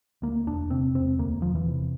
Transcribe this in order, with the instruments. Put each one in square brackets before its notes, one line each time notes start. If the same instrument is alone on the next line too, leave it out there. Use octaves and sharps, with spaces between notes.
[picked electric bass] D2 A#3
E1 D4
C3 C4
E1 C4
D2 A#3
E1 F3
E3
C3